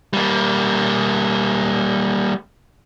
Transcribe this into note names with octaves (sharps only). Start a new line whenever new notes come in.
G3 A#3